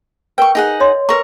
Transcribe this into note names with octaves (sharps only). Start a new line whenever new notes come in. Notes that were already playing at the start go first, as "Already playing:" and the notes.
A#4 B4 G5 C#6
D#4 G#4 F#5
C#5 D#5 C6
A#4 B4 A#5 C#6